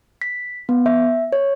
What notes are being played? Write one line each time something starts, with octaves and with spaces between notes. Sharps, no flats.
B6
B3
E5
C#5